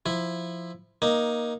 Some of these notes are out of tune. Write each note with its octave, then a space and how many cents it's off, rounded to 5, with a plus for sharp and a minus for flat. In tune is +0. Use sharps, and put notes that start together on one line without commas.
F3 +0 E4 +0
A#3 +15 D#4 +0